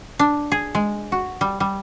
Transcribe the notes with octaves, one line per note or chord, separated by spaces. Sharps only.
D4
G#4
G#3
F#4
G3
G3